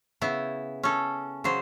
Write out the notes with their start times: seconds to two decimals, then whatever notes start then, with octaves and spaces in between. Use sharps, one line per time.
0.21 C#3 B3 E4
0.83 C#4 A4
1.44 C#3 F#3 C5